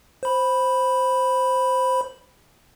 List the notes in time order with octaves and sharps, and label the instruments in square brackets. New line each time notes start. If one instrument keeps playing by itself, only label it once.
[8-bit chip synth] C5 B5